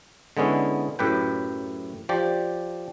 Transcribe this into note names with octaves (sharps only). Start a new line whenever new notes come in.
D3 G#3 B3 C#4 E4
F#2 A2 G4 B4 G5
F3 G4 D5